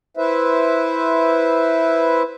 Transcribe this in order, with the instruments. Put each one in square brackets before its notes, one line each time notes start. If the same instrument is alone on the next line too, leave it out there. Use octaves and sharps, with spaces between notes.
[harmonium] E4 B4 C5 E5